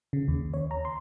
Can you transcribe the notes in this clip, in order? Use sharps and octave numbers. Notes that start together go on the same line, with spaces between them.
C#3
D#2
C#5
A#5
C6